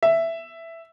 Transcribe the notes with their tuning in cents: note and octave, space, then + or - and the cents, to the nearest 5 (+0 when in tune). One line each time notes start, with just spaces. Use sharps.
E5 +5